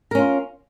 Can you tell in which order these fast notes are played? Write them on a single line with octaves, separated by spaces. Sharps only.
A#4 C#4 F4